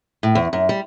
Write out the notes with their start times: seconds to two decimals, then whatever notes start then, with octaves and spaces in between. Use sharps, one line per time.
0.23 A2
0.35 E2
0.53 F#2
0.69 G3